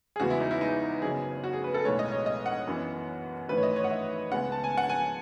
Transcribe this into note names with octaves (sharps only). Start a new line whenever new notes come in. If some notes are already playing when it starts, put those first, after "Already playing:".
G#4
E2 C#3 G#3 B3 F#4
E4
D#4
E4
D#4
F#1 F#2 C#3 F#3 B3 G#4
F#4
G#4
B4
A4
B1 A2 G#3 B3 C#5
D#5
C#5
D#5
F#5
F#2 E3 B3
G#1 F#2 E3 A3 B4
C#5
D#5
C#5
F#5
E5
C#2 C#3 G#3 B3 F#5
A5
G#5
F#5
G#5